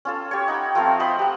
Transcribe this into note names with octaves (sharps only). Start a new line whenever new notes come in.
C#4 F4 A4
G4 C#5
D#4 F#5 G5 B5
F3 A3 C4 F5
C5 D#5 B5 D#6
G4 F#5